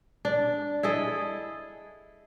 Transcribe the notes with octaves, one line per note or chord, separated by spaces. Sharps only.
D4
E4 G#4 A4 D#5